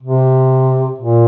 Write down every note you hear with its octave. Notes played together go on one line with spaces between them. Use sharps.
C3
A#2